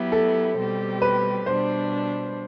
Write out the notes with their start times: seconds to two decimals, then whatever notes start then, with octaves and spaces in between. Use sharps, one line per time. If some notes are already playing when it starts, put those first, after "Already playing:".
Already playing: F#3 B3 E4 G4
0.12 A4
0.57 B2 G3 C4 G4
1.02 B4
1.46 B2 G3 D4 C5